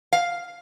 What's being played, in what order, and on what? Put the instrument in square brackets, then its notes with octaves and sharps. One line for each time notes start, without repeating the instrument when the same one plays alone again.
[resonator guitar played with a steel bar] F5